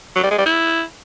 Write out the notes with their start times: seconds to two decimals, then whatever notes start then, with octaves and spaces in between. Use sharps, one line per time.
0.16 F#3
0.23 G3
0.31 G#3
0.38 G3
0.46 E4